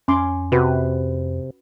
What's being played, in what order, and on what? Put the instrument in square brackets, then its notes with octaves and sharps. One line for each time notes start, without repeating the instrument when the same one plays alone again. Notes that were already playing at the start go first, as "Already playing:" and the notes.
[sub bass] F2 [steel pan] C#4 C6 D6
[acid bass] C3 [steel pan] F#4 B4